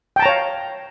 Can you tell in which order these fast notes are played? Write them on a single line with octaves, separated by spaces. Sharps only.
G5 A5 A#5 C#5 F5